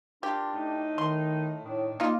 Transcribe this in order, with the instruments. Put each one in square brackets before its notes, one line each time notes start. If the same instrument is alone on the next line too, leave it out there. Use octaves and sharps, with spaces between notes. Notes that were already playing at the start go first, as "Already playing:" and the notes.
[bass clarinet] D4 [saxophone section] F4 A#4 [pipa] G4
[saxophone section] A2 D#4
[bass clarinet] D#3 [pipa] C6
[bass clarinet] A2 [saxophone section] D#3 D4
[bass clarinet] A#3 [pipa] D#4 F4